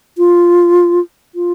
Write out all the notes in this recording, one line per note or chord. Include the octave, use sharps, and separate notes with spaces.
F4
F4